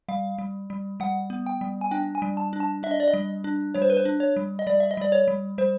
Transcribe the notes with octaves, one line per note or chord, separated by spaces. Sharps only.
G3 F5
G3
G3
G3 F#5
B3
G5
G3
G#5
D4 G5
G#5
G3
A5
D4
A5
D4 E5
D#5
D5
D#5
G3
D4
G3 C#5
C5
B4
C5
D4
C#5
G3
D#5
G3 D5
E5
D#5
G3 D5
C#5
G3
G3 C5